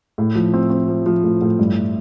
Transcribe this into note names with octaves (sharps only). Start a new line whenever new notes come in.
A2
F3
C4
C4
F3
F3
A2
A2
G2